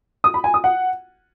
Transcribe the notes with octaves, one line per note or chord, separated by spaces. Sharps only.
D#6
B5
G#5
D#6
F#5